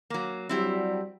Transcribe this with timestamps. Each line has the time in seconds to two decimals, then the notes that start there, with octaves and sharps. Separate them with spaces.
0.10 F#3 A#3
0.49 F#3 G3 C4 E4 G4